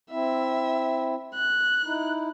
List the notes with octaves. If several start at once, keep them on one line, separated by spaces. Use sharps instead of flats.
C4 E4 E5
F#6
D#4 E4